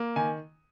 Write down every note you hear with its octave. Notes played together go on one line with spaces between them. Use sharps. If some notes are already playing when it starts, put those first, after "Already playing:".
Already playing: A#3
D#3 G#5